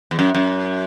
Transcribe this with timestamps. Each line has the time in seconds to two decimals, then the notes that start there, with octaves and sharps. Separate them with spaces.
0.11 E2
0.19 F#2
0.35 F#2